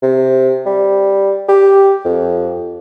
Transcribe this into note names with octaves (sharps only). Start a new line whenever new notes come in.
C3
G3
G4
F2